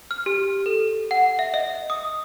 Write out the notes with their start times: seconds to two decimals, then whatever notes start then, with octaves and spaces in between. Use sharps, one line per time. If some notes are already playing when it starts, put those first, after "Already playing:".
0.11 F6
0.26 G4
0.66 A4
1.11 F#5
1.39 E5
1.54 D#5
1.90 D#6